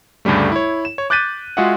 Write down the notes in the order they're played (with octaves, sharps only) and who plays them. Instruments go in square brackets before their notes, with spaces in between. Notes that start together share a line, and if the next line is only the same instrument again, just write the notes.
[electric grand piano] D2 G2 C#3 G3 A3
E4 C#5
E7
C#5
D6 F#6 G6 A6 B6 D#7
G#3 F4 F#4 G#4 E5 F#5